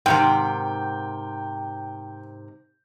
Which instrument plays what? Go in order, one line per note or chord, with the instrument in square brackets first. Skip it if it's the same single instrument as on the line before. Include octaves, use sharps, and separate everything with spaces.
[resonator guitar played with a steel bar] G#2 C3 D#3 [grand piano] G5